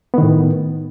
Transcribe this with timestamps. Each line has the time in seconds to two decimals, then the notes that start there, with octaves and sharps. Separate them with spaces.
0.14 B3
0.18 D#3
0.22 A2